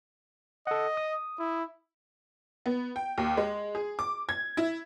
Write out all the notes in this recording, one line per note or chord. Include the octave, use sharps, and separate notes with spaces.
A4 D#5 F#5
D#6
E4
B3
G5
D#2
G#3
G#4
D6
G#6
E4